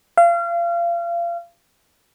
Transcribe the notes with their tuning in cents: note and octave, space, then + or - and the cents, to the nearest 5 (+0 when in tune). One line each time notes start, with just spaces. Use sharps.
F5 -30